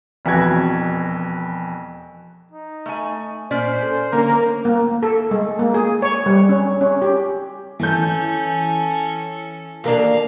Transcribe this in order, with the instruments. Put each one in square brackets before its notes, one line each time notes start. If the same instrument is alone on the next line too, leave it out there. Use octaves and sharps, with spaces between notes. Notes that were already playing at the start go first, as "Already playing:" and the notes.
[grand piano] E1 F2 E3 F#4 G#6
[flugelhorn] D#4
[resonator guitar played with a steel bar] A3 G#5
[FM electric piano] A#2 [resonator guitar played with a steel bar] C#4 D5 [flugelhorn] C5
[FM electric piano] A4
[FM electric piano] D3 C#4 [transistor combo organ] A#3
[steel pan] A#3
A4
G#3
A#3
G#4
C#5
G3
C#4
C#4
G4
[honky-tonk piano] E3 G6 [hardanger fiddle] C#4 A4
[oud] D#2 A#3 D4 [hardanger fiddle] F5